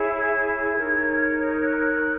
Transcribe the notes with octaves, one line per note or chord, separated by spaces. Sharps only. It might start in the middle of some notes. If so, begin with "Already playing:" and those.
Already playing: E4 G#4 C#5
G#6
G#6
D#4 A#4 C#5
F#6